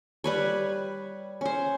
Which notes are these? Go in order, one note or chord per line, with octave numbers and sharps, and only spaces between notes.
G3 B4 C#5
C#4 C5